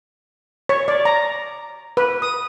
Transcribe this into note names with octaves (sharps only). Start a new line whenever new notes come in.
C#5
D5
A#5
B4
D#6